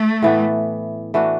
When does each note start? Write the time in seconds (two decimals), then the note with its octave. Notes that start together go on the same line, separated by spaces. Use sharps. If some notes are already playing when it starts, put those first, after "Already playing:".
Already playing: A3
0.23 A2 E3 B3
1.14 E3 A3 D4 F#4